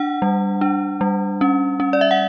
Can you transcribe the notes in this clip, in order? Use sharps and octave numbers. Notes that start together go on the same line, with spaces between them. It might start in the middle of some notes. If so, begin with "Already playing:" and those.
Already playing: D4 F#5
G3
D4
G3
C#4
C#4
D5
E5
F#5